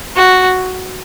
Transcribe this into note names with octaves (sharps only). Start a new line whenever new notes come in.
F#4